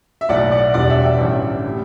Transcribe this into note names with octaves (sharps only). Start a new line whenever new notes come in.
E5
B1 A2 F#3 A3 D5 F#5
D5 F#5
E1 E2 B2 G3 D5 F#5
E5 G5
E5 G5
A1 G2 D3
A2 G3